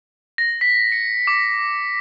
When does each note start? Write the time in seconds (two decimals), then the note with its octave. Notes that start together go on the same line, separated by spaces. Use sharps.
0.38 A#6
0.61 B6
0.92 C#7
1.27 D6